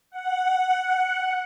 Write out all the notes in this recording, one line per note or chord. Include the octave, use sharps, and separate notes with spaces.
F#5